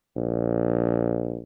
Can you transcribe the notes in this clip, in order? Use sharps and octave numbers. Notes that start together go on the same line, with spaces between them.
A#1